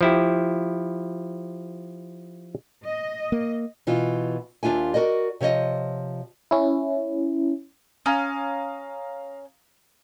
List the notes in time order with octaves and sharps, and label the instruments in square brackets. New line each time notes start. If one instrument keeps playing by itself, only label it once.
[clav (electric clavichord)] F3 E4 G4
[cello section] D#5
[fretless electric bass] A#3
[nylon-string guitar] B2 E3 F4
D#2 D4 F4 E5 G#5
F#4 A#4 D5 D#5
C3 F3 C#5 D#5
[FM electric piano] C#4 E4
[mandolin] C#4 [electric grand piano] F5 A#5 D#6